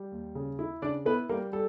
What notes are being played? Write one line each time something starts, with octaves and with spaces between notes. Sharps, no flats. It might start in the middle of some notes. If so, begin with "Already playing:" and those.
Already playing: G3
D#2
C#3
E4
C#3 D4 D5
B3 E4 B4
G3 A#3 A#4
G3 A4